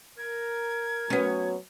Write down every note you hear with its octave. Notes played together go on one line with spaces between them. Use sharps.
A#4 G#6
F#3 B3 C#4